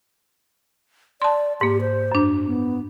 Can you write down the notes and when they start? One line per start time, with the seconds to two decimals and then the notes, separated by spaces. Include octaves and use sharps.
1.22 D5 A5 C6
1.61 G#2 A#3 G4
1.81 C5
2.12 F#2 D4
2.47 B3